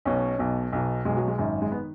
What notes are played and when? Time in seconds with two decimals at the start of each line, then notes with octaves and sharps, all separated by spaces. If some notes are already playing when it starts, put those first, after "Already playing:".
0.05 B1 B2 C#4
0.39 B1 B2
0.72 B1 B2
1.05 B1 B2 G#3
1.17 F#3
1.28 G#3
1.38 G#1 F#2 D#3
1.62 G#3
1.72 D#3 B3